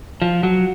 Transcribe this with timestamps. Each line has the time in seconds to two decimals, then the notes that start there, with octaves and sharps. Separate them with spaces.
0.22 F3
0.43 F#3